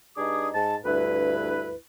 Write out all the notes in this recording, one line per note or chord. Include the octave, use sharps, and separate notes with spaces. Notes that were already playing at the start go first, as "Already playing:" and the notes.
G2 D4 D#4 G#4 D6 D#6
G#2 A5
D2 G2 E4 B4